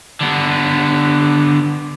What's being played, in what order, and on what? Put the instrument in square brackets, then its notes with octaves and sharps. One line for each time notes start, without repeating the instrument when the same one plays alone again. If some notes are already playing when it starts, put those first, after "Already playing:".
[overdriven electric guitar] D3 B3